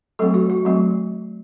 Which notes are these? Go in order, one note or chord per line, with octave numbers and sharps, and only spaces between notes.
F#3 A3 C4 A4
F#4
F#4
F#3 A3 C4